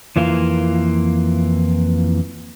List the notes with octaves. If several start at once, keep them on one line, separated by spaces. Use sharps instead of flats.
F2 E3 A#3 F4